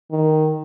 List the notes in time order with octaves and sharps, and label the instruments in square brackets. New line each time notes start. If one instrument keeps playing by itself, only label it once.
[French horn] D#3